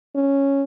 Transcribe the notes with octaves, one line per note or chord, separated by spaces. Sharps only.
C#4